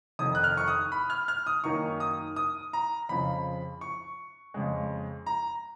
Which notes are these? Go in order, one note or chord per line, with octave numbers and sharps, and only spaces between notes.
F1 F2 D#3 D#6
F#6
F6
C#6
D#6
B5
F6
F6
D#6
F#2 D#3 A#3 D#4 C#6
D#6
D#6
A#5
F2 C#3 F3 B5
C#6
F2 C#3 G#3
A#5